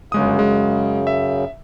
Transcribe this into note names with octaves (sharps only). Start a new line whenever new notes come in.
G1 F#2 C#3 G#3 D#6
G#3
E5